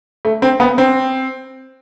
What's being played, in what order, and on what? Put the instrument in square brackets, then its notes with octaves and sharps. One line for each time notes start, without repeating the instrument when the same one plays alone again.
[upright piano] A3
C4
B3
C4